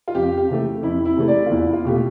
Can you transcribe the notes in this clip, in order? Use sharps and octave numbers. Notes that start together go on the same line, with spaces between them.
F4
F2 G4
G4
C3 E3 A3
F2 E4
E4
C3 E3 A3
D5
F4
E2 E4
F4
B2 A3 G4